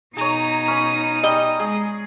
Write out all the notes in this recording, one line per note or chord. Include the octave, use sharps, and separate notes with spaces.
B2 D#4 G#4 C#5 A#5 D#6
C#4 B5
G3 D#5
G#3 G#4